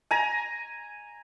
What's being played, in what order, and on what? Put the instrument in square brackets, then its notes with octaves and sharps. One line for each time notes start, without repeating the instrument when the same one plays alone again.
[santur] G#5 A#5